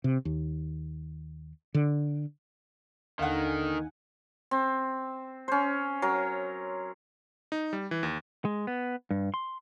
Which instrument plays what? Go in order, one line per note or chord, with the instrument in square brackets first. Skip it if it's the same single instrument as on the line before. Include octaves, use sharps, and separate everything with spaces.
[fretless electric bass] C3
D#2
D3
[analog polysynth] D#2 D#4 G#5 [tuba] D3 [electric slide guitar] D#3 [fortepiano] F5 F#5
[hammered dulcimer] C4
C#4 C5
F#3 A#4
[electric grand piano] D#4
G3
E3
D#2
[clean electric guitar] G#3
B3
G2
C6